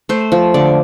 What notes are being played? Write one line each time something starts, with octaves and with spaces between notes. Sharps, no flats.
A3 C5
F3
D3 D5